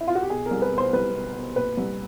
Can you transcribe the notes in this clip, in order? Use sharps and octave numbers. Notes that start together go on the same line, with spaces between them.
E4
F4
F#4
G4
B2 G#4
A#4
C2
B4
B2
C5
C2 B4
B2
B2
A#2 B4
C2